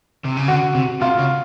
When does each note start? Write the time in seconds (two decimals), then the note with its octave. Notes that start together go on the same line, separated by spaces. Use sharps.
0.24 C3
0.36 C#3
0.48 D3 F#4
0.75 C3
1.01 C3 F4
1.19 C#3